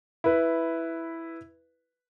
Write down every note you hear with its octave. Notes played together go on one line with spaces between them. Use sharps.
E4 B4